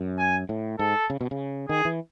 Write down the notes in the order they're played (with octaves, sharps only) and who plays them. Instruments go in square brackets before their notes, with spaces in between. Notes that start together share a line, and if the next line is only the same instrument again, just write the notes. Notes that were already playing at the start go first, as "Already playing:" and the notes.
Already playing: [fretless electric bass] F#2
[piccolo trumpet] G#5
[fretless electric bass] A2
[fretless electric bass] G#2 [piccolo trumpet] A4
[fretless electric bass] C#3
B2
C#3
[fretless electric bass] D#3 [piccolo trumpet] G#4
[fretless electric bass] E3